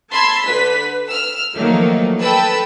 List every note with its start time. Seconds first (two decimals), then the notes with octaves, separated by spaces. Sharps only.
0.11 A5 B5 C6 E6 G#6
0.42 D3 B4 B6
1.08 E6 F6
1.57 D#3 F3 F#3 A3 A#3 D#4
2.20 A4 B4 G5 A5 B5 E6